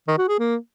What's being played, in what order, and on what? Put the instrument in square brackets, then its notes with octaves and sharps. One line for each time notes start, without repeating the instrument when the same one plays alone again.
[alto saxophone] D#3
F#4
G#4
A#3